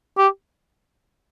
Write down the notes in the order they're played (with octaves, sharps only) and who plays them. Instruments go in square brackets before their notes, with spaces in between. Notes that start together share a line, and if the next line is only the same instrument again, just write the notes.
[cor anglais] G4